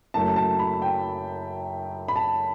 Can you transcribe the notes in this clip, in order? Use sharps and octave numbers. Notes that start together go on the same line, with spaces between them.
F#1 F#2 F#3 A3 A5
A5
B5
G5
B5
A5